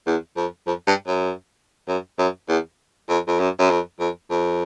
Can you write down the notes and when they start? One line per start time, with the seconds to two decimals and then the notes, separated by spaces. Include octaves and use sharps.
0.07 E2
0.37 F2
0.67 F2
0.87 G2
1.08 F#2
1.88 F#2
2.19 F#2
2.49 E2
3.09 F2
3.28 F2
3.40 F#2
3.59 F#2
3.70 F2
4.00 F2
4.30 F2